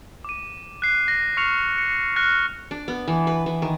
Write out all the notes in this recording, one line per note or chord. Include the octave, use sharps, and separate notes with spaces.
D6 D#7
F#6 C7
A#6
C#6 F6 C7 C#7 F7
C#7
F6 F#6 A#6 C#7
D4
B3
E3
B4
E3
D#3